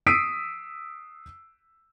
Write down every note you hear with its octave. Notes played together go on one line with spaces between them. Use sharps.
D#6 E6 B6 C7 D7 D#7